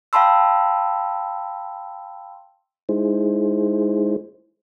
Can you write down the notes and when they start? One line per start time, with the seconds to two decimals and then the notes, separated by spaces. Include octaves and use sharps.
0.13 F5 G5 A5 B5 C6 E6
2.89 G#3 D#4 E4 G#4 C5